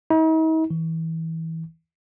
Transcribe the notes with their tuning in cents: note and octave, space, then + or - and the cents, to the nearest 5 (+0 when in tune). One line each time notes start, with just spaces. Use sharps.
D#4 +45
E3 -25